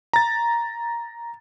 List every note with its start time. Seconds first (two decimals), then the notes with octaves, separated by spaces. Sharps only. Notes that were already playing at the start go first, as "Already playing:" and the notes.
0.13 A#5 A6